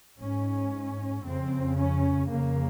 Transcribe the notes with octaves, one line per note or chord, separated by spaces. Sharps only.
G#2 C#4
F2 C#3 C4
C#4
F2 C#3 A#3